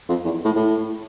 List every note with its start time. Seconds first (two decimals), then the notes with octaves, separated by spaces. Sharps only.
0.09 F2
0.25 E2
0.45 A2
0.56 A2